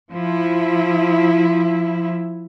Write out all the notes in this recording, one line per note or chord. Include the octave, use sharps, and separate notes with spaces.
F3 E4